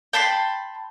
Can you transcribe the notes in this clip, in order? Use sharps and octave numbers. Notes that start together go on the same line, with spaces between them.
G5 A5 B5 C6